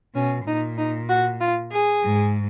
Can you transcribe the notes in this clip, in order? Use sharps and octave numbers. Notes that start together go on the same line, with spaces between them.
B2 C#4
A#2 D#4
D#4
F#4
F4
G#4
G#2